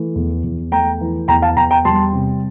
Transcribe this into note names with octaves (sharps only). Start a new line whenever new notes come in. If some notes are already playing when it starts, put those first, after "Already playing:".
Already playing: E3 A3
E2
E2
A3 G5 A#5
E3
E2 G5 A#5
F5 A5
E2 G5 A#5
G5 A#5
G3 A5 C6
C3